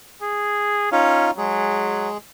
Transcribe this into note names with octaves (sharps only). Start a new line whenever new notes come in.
G#4
C#4 D#4 F4 F5
F#3 G#3 G#4